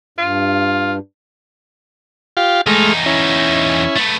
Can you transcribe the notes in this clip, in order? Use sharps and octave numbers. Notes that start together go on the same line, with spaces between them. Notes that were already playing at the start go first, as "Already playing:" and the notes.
G2 F4
F4 G4 F5
E2 G#3 A3 D#4 F6
C#4 E4
A3 B3